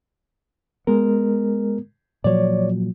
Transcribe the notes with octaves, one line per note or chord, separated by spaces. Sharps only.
G#3 B3 A#4
A#2 F3 F#3 C#5 D5